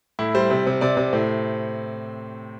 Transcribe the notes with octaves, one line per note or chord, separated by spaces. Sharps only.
A2 E4
G3 C5
C3
C3
C3 D5
C3
A2 C4